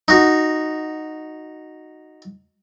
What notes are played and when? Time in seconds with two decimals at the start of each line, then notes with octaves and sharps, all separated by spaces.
0.08 D#4 F#4